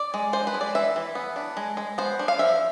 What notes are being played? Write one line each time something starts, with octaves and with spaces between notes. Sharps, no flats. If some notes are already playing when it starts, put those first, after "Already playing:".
Already playing: D5
G#3
D4 C5
B4
G#3
D5
E3 E5
E3
B3
D4
G#3
G#3
B3 C5
D4
F5
F3 E5